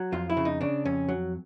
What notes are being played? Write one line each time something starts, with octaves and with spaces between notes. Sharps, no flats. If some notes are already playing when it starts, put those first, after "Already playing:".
Already playing: F#3
F2 F4
E4
C#3
D#4
C#3 D4
F2 C#4
F#3